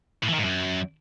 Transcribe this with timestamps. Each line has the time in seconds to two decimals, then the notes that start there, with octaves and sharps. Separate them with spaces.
0.23 A2
0.28 E3
0.34 D#3
0.39 G#2
0.44 F#2